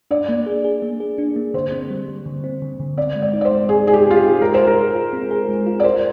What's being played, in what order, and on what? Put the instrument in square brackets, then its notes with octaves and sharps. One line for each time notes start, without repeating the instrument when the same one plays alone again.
[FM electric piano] D4 [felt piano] D5
[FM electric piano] A#3
G#4
G#4
A#3
G#4
D4
A#3
[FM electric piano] D3 [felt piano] C5
[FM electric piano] C4
G3
G3
D3
C4
D3
D3
[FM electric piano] C4 [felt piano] D5
[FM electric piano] G#3
[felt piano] D5
[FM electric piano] D#4
[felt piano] D5
C5
[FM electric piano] G#3
[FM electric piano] G#3 [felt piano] G#4
[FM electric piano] D#4 [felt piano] G#4
[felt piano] G4
[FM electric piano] C4
[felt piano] F4
G4
[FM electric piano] D#4
[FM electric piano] G#3 [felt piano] A#4
[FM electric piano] F4 [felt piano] C5
[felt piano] A#4
[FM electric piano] G#4
F4
C4
G#4
G#3
F4
[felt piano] D5
[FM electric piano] A#4 [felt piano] C5